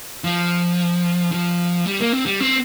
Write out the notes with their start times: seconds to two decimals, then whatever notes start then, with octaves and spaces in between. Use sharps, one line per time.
0.24 F3
1.32 F3
1.85 G3
2.00 A#3
2.12 C4
2.26 G3
2.40 C4